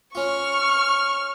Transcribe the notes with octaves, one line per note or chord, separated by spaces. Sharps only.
C#4 F4 C#6 F6